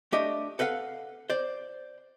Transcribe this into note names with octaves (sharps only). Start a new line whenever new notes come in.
A3 D4 G4 D#5
A4 B4 D#5 F5 F#5
C5 D5